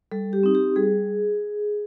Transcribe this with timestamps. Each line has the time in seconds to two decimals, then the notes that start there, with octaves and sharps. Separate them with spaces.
0.12 G3 A4
0.33 G4
0.43 C4 D#4
0.55 G4
0.76 G3 G#4